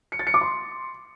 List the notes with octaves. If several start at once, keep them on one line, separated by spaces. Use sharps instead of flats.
C#7
A6
C#7
D6
C6